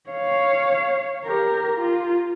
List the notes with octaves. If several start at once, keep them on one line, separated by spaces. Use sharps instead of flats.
C#5 F5
G4 A#4
F4